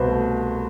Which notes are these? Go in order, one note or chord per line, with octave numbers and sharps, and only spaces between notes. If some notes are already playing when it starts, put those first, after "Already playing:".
Already playing: C2 B2 B4 C5
A3